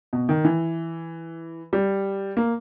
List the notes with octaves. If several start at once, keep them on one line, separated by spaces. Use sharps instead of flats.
B2
D#3
E3
G3
A#3